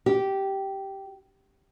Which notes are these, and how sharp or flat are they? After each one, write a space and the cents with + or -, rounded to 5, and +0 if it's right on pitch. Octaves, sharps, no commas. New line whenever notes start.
G4 -10